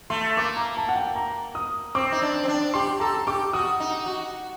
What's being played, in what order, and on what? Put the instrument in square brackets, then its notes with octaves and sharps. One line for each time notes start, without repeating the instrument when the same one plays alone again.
[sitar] A3 [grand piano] C6
[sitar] A#3 [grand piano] D6
[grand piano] A#5
A5
F#5
G5
A#5
D#6
[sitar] C4 [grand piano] D6
[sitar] D#4
D4
C4
D4
[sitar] G4 [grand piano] C6
[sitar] A4 [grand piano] A#5
[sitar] G4 [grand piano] D6
[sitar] F#4 [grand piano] D#6
[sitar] D#4
F#4